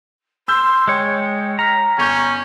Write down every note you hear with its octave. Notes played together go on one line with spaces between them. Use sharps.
C6 E6 G6
G#3 C#5 G5
A#5 F6 B6
G1 C#4 C#6 G6